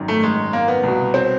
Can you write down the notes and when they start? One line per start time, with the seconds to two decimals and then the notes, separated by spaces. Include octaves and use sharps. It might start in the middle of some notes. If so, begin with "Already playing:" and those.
Already playing: G#1 F#2 D#3
0.08 A3
0.23 G#3
0.53 A#3
0.68 B3
0.83 C2 B2
1.14 C4